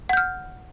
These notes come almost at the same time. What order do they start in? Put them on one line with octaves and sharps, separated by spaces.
F#5 G6 F6